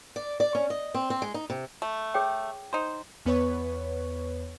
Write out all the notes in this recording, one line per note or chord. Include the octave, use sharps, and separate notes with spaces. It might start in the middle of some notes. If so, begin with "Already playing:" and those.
D5
D5
C#4
D#5
C4
C4
G#3
D#4
C3
A3
G#4 C#5 G5
D#4 C5
E2 B3 B4 C#5 C#6